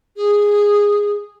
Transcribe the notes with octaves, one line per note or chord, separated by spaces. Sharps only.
G#4